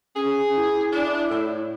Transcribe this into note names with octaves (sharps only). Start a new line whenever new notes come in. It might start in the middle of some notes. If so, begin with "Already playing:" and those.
C#4 G#4
E4
D4 E4
A2